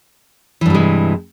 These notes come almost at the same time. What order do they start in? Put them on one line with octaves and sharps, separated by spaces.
E3 G2 C3 G#3